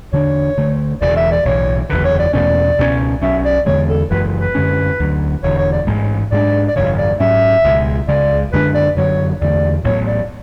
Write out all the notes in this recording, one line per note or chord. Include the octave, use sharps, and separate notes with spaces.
E2 D3 A3 D4 C#5
D2 D3 A3
E1 E2 C#3 D5
E5
D5
B1 A2 E3 C#5
F#1 E2 D3 B4
C#5
D5
E2 B2 A3 C#4 D5
C#2 B2 A3 C#4
B1 B2 F#3 C#4 E5
D5
E2 D3 G#3 B3 C#5
A4
F#1 F#2 E3 G#3 B4
B4
F#2 D3 G#3 C#4
D2 D3 F#3
E1 E2 D3 C#5
C#5
D5
A1 G#2 G#3
G#2 G#3 D4 D5
D5
G#1 F#2 C#3 C#5
D5
G#2 F#3 C#4 E5
C#2 B2 G#3
C#2 C#3 G#3 D5
F#2 D3 G#3 D4 B4
D5
F#2 D3 F#3 C#5
E2 D3 A3 D5
A1 A2 F#3 B3 C#5
D5